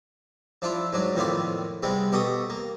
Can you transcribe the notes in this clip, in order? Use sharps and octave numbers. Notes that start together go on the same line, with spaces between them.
F3 D4 E4 F4
G#2 F#3 D4
F2 A2 D#3 B3 F4 D5
C3 G3 G#3 B3
B2 G4 A4 G5 C#6 D#6
A#3